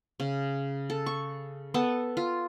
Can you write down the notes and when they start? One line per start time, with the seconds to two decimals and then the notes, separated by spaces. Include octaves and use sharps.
0.20 C#3
0.90 A4
1.06 C#6
1.74 B3 A4 A5
2.17 F4